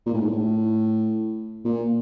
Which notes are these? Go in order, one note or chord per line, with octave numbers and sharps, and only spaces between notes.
A#2
A2
G#2
A2
A#2